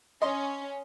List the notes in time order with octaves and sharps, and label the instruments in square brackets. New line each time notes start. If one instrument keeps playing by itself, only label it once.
[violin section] C#4 [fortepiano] D#5 C6